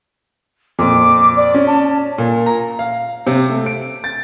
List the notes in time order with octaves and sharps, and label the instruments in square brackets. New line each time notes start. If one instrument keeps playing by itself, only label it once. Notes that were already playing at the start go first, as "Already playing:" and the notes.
[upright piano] F2 A#2 [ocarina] D6
[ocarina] D5
[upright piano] C#4
[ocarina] A5
[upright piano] A#2
A#5
F5
C3
A3
D7
A6